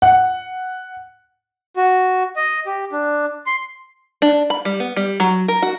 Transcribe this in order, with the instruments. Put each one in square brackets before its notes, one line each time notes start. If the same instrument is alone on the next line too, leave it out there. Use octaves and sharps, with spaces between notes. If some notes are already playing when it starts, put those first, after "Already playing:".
[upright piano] F#5
[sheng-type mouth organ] F#4
D#5
G4
D4
C6
[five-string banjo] D4
B5
G3
B3
G3
F#3
A#4
F#4